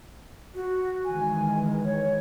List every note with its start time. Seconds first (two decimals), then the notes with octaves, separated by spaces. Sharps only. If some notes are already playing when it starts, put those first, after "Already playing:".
0.54 F#4
1.05 D#3 E3 G#3 G#5
1.84 C#5